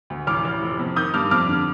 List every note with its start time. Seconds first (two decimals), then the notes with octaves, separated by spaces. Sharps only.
0.10 D2
0.27 A1 D6 F6
0.45 A1
0.62 F1
0.79 F2
0.96 D#3 D#6 G6
1.14 G2 D6 F6
1.31 F2 D6 F6
1.48 D3